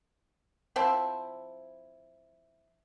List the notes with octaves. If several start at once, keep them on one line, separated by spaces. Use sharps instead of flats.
F3 C4 E4